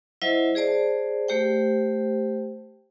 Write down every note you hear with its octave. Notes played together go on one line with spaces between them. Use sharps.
F#3 E4 C5 D#5 E5
G#4 C5 D5 A5
A3 G4 C5 G5